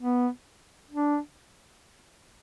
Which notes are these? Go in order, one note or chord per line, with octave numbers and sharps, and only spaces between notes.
B3
D4